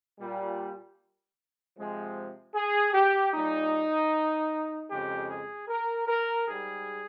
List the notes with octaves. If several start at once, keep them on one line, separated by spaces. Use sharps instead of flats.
A#2 G3
C3 F3 G#3
G#4
G4
A#2 G3 D#4
F2 C#3 G#3 G4
G#4
A#4
A#4
G#2 G3 G#4